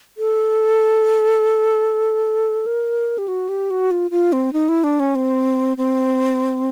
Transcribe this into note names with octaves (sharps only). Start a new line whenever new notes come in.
A4
A#4
G4
F#4
G4
F#4
F4
F4
C4
D#4
E4
D4
C#4
C4
C4